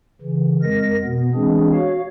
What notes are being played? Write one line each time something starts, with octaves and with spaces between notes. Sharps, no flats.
C#3 E3
F2 G#3 A#4 A#6
B2 B3
E3 G#3 C4 D4 G#4
F#4 C#5 F5